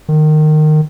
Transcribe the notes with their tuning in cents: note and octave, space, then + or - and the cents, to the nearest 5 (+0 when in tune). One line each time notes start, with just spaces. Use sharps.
D#3 -20